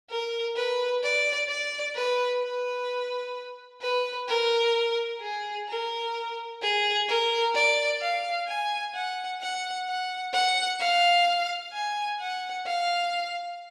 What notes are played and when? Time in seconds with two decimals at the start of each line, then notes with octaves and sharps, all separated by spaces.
0.09 A#4
0.56 B4
1.03 D5
1.49 D5
1.95 B4
2.43 B4
3.82 B4
4.28 A#4
5.21 G#4
5.68 A#4
6.61 G#4
7.08 A#4
7.55 D5
8.01 F5
8.47 G#5
8.94 F#5
9.41 F#5
9.87 F#5
10.33 F#5
10.80 F5
11.73 G#5
12.20 F#5
12.66 F5